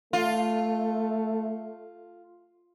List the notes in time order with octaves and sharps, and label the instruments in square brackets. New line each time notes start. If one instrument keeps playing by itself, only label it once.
[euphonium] A3 [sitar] F4